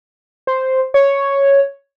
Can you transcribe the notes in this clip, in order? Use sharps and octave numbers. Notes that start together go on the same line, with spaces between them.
C5
C#5